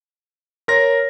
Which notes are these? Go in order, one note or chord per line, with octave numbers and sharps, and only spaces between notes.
A#4 C#5 C6 A#6